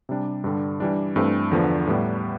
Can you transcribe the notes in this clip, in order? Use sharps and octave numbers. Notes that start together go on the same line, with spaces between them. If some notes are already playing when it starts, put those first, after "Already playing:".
C3 G3 D4
G2 D3 G3
E3 G3 D4
G2 E3 A3 C4
E2 D3 F3 B3
A2 G3 B3